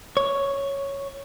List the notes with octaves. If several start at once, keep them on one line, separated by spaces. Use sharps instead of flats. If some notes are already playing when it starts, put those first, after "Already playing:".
C#5